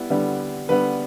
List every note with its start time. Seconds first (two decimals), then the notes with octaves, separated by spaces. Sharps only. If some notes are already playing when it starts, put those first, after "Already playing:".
Already playing: G3 B3 E4
0.10 D3 G3 B3
0.69 D3 G3 B3 B4